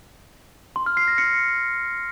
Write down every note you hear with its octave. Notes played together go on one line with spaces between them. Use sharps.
C6
F6
C7
A#6
C#7